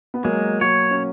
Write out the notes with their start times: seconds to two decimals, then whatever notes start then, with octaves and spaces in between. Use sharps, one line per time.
0.14 B3
0.23 F#3 G#3 A#3
0.61 F#3 A#3 C#5
0.91 C#4